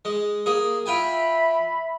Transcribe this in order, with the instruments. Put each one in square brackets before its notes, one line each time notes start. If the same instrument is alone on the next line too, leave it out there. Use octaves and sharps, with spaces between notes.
[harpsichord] G#3
A#3 G#4
[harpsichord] F4 G5 G#5 [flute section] E5 B5